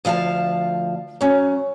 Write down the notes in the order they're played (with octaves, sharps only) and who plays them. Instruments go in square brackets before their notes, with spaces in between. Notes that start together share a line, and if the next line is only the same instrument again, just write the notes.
[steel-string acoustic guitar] D2 F3 F5 G#5 A5
F#3 C#4